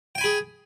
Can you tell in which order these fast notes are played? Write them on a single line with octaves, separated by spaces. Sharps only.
G5 G#5 B5 G#4